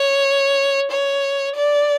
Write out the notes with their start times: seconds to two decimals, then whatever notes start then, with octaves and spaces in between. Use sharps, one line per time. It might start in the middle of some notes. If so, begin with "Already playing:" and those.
Already playing: C#5
0.92 C#5
1.56 D5